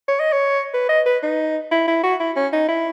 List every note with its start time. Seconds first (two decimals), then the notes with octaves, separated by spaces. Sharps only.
0.08 C#5
0.20 D#5
0.32 C#5
0.74 B4
0.89 D#5
1.06 B4
1.23 D#4
1.71 E4
1.87 E4
2.03 F#4
2.20 E4
2.36 C#4
2.52 D#4
2.68 E4